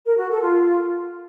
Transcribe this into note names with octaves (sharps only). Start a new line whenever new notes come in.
A#4
F#4
A4
F4